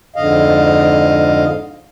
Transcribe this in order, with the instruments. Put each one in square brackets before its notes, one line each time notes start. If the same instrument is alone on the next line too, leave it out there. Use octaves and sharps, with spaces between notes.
[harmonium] F2 G#2 D3 D#5 F5